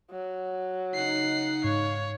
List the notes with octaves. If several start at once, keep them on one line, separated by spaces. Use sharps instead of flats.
F#3
C#3 D#4 F#5 C7
G#2 C#5 F5